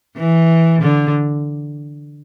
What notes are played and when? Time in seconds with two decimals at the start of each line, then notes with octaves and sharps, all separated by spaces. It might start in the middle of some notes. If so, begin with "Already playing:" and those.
0.17 E3
0.82 D3